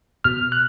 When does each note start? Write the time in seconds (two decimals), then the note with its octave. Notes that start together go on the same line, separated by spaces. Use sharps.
0.24 B2 F6
0.52 F#6